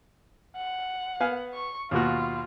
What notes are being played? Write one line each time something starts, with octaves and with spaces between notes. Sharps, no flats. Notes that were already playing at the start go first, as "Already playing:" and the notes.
F#5
B3 F5 G#5
C#6
D#2 B2 F4 F#4